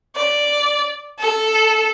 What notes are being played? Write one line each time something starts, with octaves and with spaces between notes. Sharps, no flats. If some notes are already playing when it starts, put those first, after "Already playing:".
D5
A4